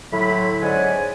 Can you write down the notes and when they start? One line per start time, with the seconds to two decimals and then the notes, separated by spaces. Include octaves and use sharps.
0.11 A2 D3 F#3 B5
0.61 G#2 C#4 D5 F#5 G#5